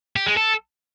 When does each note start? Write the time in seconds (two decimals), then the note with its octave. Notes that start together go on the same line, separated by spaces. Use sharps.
0.16 G4
0.27 G#3
0.37 A4